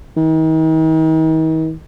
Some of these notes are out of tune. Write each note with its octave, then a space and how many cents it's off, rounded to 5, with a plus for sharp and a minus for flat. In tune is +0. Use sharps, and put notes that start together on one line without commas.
D#3 +40